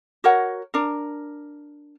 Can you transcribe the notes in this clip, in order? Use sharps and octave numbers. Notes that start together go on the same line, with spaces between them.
F#4 A#4 C#5 F#5
D4 A#4